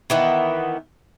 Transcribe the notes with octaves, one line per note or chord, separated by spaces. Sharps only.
D#3 E3 B3